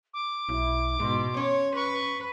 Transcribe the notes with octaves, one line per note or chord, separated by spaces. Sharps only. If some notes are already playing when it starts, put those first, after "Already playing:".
D6
B1 E4
G#2 B2 C6
C#4 C#5
B4 C#6